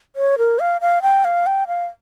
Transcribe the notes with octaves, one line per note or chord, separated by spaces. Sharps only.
C#5
A#4
F5
F5
G5
F5
G5
F5